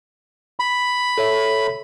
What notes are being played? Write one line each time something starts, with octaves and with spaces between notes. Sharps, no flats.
B5
A4 C#5 E5